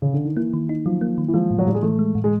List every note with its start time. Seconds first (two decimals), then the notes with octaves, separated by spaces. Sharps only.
0.02 C#3
0.14 D3
0.25 D#3
0.36 E3 A#3
0.53 D#3
0.69 D#4
0.86 F3 F#3
1.01 A#3
1.18 D#3
1.28 E3
1.34 F3 G#3
1.51 A2
1.59 F#3
1.67 A2 G3
1.75 G#3
1.82 E3 A3
1.99 G#3
2.15 A2
2.24 G#3